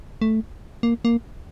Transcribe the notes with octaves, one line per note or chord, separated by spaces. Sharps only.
A3
A#3
A#3